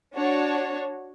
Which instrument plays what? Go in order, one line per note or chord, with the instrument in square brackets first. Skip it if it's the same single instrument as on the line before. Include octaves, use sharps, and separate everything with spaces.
[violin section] D4 F#4 C#5